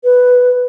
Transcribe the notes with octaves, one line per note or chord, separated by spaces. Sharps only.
B4